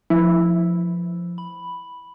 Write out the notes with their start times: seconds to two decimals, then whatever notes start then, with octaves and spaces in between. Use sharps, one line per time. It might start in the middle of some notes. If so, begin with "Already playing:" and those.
0.10 F3 E4
1.38 B5